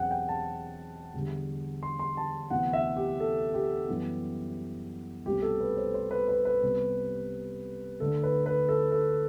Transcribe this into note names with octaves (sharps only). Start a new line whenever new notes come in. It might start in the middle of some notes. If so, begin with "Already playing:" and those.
Already playing: E2 B2 F#3 C4 F#5 G5
G5
A5
E2 D3 G3
C6
C6
A5
D2 C3 E3 B3 F#5
E5
G4
A4
G4
F#2 E3 G3 B3
C2 B2 A3 C4 G4
A4
B4
C5
C5
B4
B4
B4
C2 C3 G3 B3
D2 D3 A3 A4
B4
B4
A4
A4